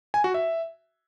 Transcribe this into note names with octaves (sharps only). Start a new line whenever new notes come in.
G#5
F#4
E5